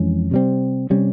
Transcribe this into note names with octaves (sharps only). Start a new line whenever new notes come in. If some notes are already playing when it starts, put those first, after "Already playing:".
Already playing: F2 E3 G#3 C#4
C3 G3 C4
C3 G3 C#4